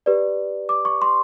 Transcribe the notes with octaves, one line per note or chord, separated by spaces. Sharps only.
G4 B4 D5
D6
C#6
C6